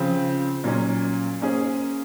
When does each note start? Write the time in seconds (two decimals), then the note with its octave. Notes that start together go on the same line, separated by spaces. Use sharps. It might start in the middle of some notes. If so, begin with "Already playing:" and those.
Already playing: C#3 F3 C4
0.64 A#2 F#3 A#3 C#4
1.41 A#3 C#4 G#4 C5